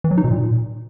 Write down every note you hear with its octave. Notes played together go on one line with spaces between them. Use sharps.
E3
F#3
D#4
B2
A#2